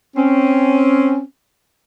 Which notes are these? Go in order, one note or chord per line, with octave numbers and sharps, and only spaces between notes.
C4 C#4